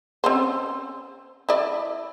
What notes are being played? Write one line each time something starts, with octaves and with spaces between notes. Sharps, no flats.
C4 C#4 C5
E4 D5